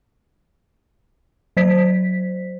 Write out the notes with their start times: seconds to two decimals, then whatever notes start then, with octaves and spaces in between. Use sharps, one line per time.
1.57 F#3 C5 B6